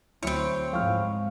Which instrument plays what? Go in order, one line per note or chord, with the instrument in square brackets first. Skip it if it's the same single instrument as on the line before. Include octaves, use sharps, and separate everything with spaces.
[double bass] D2 [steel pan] F#3 E4 [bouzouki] C4 C#5
[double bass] G#2 G#3 [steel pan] F3 E4 [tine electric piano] F5 C#6 F6